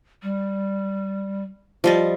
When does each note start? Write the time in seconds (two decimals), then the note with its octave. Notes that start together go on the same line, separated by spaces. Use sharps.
0.23 G3
1.84 F3 G3 D#5